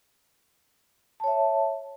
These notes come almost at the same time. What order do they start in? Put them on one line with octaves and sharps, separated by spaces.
A5 C#5 E5